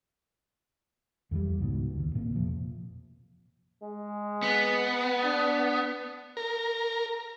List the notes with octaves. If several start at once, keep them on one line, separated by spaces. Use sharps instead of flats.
F2 E3 F3 G3
C#2 G#2 B2
F#1 D#2
A1 A#2 A#3 C4
F2 C3 F3
G#3
B3
D4
A#4